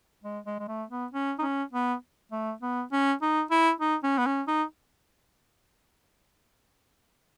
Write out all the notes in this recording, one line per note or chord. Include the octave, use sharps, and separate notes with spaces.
G#3
G#3
G#3
A3
B3
C#4
D#4
C#4
B3
A3
B3
C#4
D#4
E4
D#4
C#4
B3
C#4
D#4